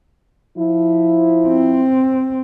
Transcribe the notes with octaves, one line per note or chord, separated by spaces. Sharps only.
F3 E4
C4